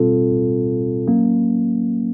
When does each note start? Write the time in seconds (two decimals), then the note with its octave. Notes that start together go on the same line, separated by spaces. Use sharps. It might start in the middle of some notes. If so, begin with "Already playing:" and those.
Already playing: B2 G3 C4 F4 A4
1.07 F#3 A#3 C#4